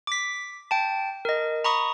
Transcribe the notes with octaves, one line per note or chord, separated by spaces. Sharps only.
D6 B6
G5 A5
A#4 D#5
A#5 B5 C#6 D#6